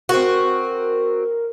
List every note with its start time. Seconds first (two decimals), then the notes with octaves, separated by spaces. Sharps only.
0.09 C4 F#4 A#4